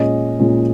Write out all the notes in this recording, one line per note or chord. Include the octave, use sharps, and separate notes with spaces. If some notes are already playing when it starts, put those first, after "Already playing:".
Already playing: A#2 G#3 C#4 D#5
A#2 G#3 C#4